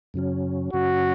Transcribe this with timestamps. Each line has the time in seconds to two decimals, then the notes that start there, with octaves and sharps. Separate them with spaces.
0.14 F#2 C#3 F#3 C#4
0.73 F#2 C#3 F#3 C#4 F#4